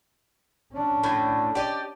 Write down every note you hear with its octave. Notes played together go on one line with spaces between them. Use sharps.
C#4 D4
A2 D3
G4 D5 D#5